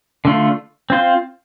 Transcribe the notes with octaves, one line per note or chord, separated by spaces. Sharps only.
D3 A3 F4
C4 F4 C5